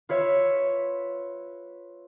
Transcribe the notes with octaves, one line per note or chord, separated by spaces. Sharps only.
F4 B4 C#5 E5